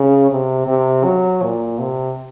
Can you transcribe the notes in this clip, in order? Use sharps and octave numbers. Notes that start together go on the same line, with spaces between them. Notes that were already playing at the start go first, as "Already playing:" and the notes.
Already playing: C#3
C3
C3
F#3
A#2
C3